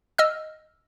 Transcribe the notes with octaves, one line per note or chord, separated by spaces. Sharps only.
D#5 E6 F6